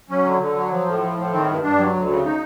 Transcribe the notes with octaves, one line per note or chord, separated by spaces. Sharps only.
F#3 C#4
D3
D3
F#3
F3
A2
F3
A2
D#3 C4
G2
G2 D4
F#3
D2
C#3
D#4